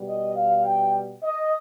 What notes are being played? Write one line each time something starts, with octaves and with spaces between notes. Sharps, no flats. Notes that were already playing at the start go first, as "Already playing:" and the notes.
Already playing: B2 G3
D#5
F5
G5
D#5